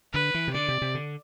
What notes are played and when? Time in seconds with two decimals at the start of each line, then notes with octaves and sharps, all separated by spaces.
0.13 D3 B4
0.34 E3
0.48 C3
0.54 D3 D5
0.68 C3
0.82 C3
0.95 D3